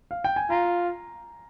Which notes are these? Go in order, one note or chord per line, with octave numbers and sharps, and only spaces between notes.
F5
G5
G#5
F4 A#5